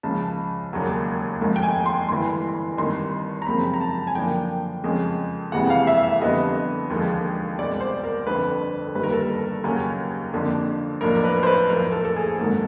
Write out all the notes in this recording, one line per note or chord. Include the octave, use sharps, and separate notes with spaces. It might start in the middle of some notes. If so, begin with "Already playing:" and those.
C#2 C#3 F3 A5
E1 D#2 C#3 F#3 A#3
G#1 G#2 F3 A3
G5
G#5
C6
G1 G2 E3 C6
G#1 G2 D#3 C6
A#5
F#2 C#3 F3 G#3 C4 B5
A#5
A5
G#5
F#2 D3 F3 A#3 D4 G5
F2 C#3 F3 G#3 C#4
F1 F2 C3 E3 G#3 F#5
F5
E5
E5
F2 D3 G3 B3 D#5
E1 D#2 D3 F3 G#3
C2 B2 G#3 D5
C5
A#4
G1 F2 D3 B4
G1 G2 D#3 G3 A#3 B4
A#4
A4
A#4
D#2 C#3 F#3 A#3 C#4
F2 D3 F3 A#3 D4
B1 A2 F3 A#3 D4 A#4
A#4
B4
C5
B4
A#1 A2 F3 A#4
A4
A4
G#4
G#1 G#2 D#3 F#3 A#3 A4